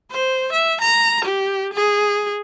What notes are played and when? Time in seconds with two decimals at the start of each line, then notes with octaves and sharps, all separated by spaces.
0.11 C5
0.53 E5
0.81 A#5
1.25 G4
1.74 G#4